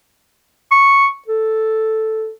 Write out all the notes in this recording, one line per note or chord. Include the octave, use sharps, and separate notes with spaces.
C#6
A4